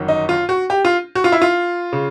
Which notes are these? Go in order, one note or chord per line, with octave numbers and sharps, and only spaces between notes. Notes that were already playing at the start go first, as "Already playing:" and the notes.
Already playing: G1 F#2 D#3
D#4
F4
F#4
G4
F4
F#4
F4
E4
F4
C#3